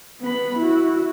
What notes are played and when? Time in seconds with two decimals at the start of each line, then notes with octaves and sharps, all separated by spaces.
0.21 B3 B5
0.58 E4 F#4